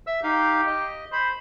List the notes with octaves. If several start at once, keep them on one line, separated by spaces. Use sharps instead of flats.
E5 E6
D#4 G4 F5
D#5
C5 B5